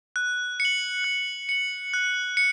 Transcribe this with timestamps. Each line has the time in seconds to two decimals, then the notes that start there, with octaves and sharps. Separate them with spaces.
0.16 F#6
0.60 C#7
0.65 F#7
1.04 F#6
1.49 C#7 F#7
1.93 F#6
2.37 C#7